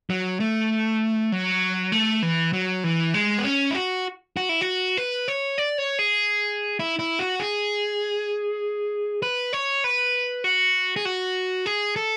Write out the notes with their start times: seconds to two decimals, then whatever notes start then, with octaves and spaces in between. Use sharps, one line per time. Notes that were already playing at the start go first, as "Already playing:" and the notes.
0.10 F#3
0.40 A3
1.32 F#3
1.92 A3
2.22 E3
2.53 F#3
2.84 E3
3.14 G#3
3.39 B3
3.44 C#4
3.71 E4
3.75 F#4
4.37 F#4
4.49 E4
4.61 F#4
4.97 B4
5.28 C#5
5.58 D5
5.78 C#5
5.99 G#4
6.79 E4
6.99 E4
7.19 F#4
7.40 G#4
9.22 B4
9.53 C#5
9.84 B4
10.44 F#4
10.96 G#4
11.05 F#4
11.66 G#4
11.96 A4